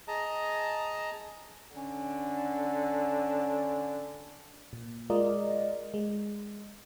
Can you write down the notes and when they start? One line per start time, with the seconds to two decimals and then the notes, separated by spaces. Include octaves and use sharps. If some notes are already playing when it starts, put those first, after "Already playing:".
0.08 G#4 D#5 A5 A#5
1.75 D3 C#4
4.73 A#2
5.10 G#3 F4 A#4 D5 D#5
5.94 G#3